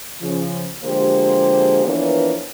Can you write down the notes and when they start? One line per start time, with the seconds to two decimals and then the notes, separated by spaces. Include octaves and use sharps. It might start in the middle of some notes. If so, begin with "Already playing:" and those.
0.21 C#3 F3
0.84 D3 F3 G#3 A#3 G4 C5
1.84 E3 F3 A#3 B3 D4 C#5